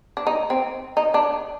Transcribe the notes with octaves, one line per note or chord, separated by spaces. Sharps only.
D4
D#4
C4
D#4
D4